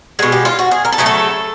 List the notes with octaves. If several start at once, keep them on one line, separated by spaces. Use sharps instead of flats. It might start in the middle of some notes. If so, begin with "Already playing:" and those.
B2 G#3 G#4
G4
F4
F#4
G#4
A#4
A4
C#3 F#3 A3 G#4
A4